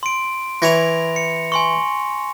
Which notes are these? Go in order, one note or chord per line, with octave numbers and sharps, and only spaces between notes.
C6 D7
E3 E4 C#5 A#6 F7
C#7
G#5 C6 C#6